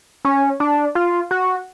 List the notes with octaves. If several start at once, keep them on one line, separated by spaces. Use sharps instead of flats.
C#4
D4
F4
F#4